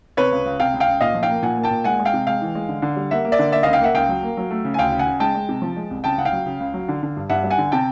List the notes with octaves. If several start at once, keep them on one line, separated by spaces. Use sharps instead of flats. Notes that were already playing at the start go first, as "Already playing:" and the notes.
C3 B4 C#5
C#2
C#2
C3 F5 G5
C#2
F5 G5
C#2
A#2 D#5 F5
F3
F5 G5
A#3
A#2 F#5 G#5
A#3
G5 A5
A#2
G#3 F#5 G#5
G#3
F5 G5
C3
G#3 F5 G5
E3
G#3
D3
D3
G3
A#3 E5 F#5
A#3
D5 E5
D3
A#3 D5 E5
C#2 D#5 F5
F5 G5
A#3 E5 F#5
C#2 F5 G5
F#3
A#3
F#3
A3
C#3
G#5
D2 F5 G5
C#3
F#5 G#5
C#3
G#3 G5 A5
G#3
C3
F3
G#3
C2
C#3 G5 A5
C#2 F#5
F5 G5
F#3
C#3
C#2
F#3
D3
D3
G2
G2 E5 F#5
G3
F#5 G#5
D3
C3 G5 A5